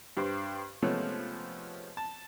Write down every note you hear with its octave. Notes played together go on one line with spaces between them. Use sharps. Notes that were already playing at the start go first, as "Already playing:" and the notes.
G2 G4 B4 C5
C3 F3 G#3 A3 B3 C#4
A5